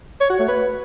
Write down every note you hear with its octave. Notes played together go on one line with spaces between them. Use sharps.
C#5
F#4
A3
B4